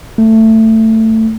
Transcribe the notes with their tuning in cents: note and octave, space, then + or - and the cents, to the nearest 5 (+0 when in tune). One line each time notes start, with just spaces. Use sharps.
A3 +15